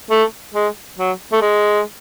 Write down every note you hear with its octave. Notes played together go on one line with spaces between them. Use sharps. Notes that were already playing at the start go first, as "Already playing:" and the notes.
A3
G#3
F#3
A3
G#3